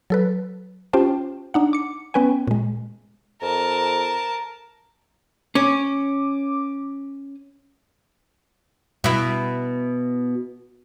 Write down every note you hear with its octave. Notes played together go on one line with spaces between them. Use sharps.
F#3 A4 B4
C#4 F4 G4 C5 G5 A5
D4 D#4 F#5
D6 C#7
B3 C#4 B4 G5 G#5
A#2 G#3
F2 A#4 A5
C#4 D6
B2 E4